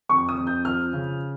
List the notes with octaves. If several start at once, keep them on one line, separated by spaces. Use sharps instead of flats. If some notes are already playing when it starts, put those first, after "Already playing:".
F2 C#6
D#6
F2
G6
F3 F6
C#3